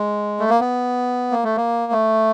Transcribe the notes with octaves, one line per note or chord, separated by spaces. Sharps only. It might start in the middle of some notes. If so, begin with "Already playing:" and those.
Already playing: G#3
A3
A#3
B3
A#3
A3
A#3
A3